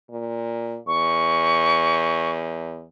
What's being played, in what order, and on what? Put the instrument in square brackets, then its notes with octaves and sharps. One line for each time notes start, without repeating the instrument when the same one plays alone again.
[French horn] A#2
[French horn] E2 [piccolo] C#6